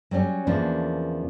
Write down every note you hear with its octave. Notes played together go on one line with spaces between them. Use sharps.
F#3 G3 C4 C#4
E2 C#3 F3 A#3 D4